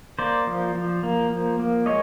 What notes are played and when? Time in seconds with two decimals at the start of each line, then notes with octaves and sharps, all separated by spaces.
0.19 A#3 C5 D5
0.47 F3
0.75 F3
1.03 A#3
1.31 F3
1.59 A#3
1.86 G#3 C#5 D#5